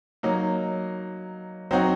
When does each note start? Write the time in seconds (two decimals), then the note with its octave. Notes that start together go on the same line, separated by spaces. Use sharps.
0.23 F#3 A#3 D#4
1.71 F#3 C4 D#4 F#4